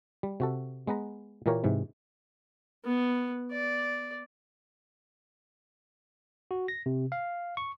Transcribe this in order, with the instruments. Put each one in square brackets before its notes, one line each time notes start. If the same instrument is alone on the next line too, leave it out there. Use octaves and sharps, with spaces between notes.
[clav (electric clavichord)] G3
C3 F#4 A4
G#3 B3 B4 A#5
A#2 E3 A#3 G4 A#4 C#5
G#2 C3 E3
[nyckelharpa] B3
D5
[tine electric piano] F#4
A#6
C3
F5
C#6